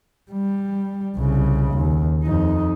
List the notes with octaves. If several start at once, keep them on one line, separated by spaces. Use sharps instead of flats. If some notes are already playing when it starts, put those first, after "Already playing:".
G3
C2 C#3
D#2
F2 D#4